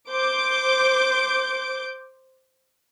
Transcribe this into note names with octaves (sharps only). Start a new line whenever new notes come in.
C5 D6 G6 D7